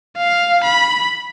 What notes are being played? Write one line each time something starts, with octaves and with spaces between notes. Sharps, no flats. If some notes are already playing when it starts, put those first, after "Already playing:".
F5
B5